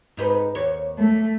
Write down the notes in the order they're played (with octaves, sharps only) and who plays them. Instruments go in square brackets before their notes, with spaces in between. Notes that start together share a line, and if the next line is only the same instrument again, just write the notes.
[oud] G#2 D#4 B4
D#2 C#5
[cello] A3